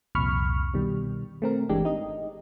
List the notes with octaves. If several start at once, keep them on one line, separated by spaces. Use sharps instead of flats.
C2 F2 A#2 B5 C#6 F6
B2 D#3 G3
A3 C4 A#4
G1 E3 G#3 D4 G4
D#4 D#5